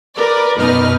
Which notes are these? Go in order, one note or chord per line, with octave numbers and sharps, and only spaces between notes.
A#4 B4 D5
F#2 B2 D#4 B4 D#5 F6